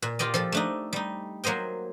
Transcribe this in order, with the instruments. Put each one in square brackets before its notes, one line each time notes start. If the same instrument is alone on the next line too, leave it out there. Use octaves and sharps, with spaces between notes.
[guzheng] A#2
F4 G4 D5 D#5
F3 A4 A5
A3 D4 D#4
G3 D#4
F#3 A#3 C5 D#5 G5